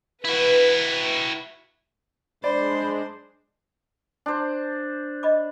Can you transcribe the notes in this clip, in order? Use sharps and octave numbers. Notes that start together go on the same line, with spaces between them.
E4 F#4 B4
G#3 D4 C5 D5 B5
D4 C5
D#5 B5 D6